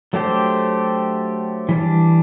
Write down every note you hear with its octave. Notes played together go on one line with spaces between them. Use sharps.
F#3 A3 D4 G4 C5
E3 G3 D4